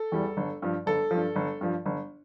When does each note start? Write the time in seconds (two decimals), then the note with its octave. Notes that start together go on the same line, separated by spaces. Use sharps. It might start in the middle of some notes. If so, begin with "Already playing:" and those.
Already playing: A4
0.12 E2 E3 G3
0.37 G1
0.62 G2 F3
0.86 G1 A4
1.11 G2 F3
1.36 G1
1.61 G2 F3
1.86 G1